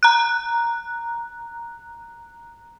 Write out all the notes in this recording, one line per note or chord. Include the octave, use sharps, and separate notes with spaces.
A#5 F#6